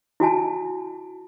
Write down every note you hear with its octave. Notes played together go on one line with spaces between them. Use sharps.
E4 F#4 G#5 A5